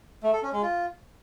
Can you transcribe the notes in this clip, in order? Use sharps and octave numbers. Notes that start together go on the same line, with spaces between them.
A3
A4
C#4
G#3
F4